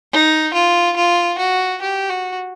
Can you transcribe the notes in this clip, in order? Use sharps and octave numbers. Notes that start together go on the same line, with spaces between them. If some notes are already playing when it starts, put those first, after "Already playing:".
D#4
F4
F4
F#4
G4
F#4